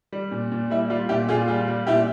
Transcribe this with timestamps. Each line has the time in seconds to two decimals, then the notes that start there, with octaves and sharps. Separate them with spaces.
0.12 G3
0.31 A#2
0.52 A#2
0.70 G3 E4
0.90 G3 F4
1.09 A#2 E4 G4
1.29 A#2 F4 G#4
1.48 G3 F4
1.68 G3
1.87 A#2 E4 G4